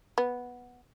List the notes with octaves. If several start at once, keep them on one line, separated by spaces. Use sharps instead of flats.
B3